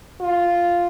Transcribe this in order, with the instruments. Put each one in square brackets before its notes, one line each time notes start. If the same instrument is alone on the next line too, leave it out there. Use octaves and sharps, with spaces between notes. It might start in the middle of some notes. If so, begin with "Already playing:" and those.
[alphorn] F4